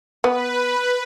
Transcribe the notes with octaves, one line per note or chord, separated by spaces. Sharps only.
B3 B4